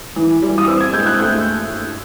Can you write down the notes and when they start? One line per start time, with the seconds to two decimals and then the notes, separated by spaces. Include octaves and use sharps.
0.16 E3
0.42 G3
0.58 D#6
0.67 C4 E6
0.81 G#6
0.93 G#3 G6
1.06 F#6
1.19 A3 G6